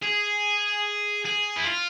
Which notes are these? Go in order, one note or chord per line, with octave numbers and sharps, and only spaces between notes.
G#4
G#4
E4
F4